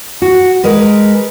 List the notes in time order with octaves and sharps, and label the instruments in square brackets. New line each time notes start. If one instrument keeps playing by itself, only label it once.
[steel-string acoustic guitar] F#4
G#3 A#4 B4